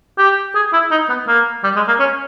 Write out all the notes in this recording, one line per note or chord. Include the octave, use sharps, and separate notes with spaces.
G4
G#4
E4
D#4
B3
A#3
G3
G#3
A#3
C#4